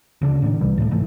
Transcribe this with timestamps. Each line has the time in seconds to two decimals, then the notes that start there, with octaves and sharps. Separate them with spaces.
0.22 D2 C#3 A3 D4
0.42 A2 D3 D#3
0.61 C2 C3 E3 G3
0.78 C#2 A2 F3 A3
0.91 G#2 E3 A3